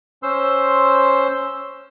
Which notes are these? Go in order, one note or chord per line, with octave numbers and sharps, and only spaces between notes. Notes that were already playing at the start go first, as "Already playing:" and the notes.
C#4 C5 C6 E6